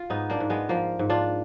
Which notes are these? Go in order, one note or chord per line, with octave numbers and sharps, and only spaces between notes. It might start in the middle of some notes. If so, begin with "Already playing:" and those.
Already playing: F4
G#2 B3 D#4
A#3 D4
G#2
G#3 B3
F3 A#3
G#2
D4 F4